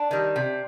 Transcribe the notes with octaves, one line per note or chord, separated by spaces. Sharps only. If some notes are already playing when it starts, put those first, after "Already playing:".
Already playing: D4
D#3 G3
C3